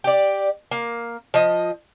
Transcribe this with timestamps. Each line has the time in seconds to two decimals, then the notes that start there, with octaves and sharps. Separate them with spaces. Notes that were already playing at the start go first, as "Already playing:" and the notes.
0.04 G4 D5
0.71 A#3
1.34 F3 D#5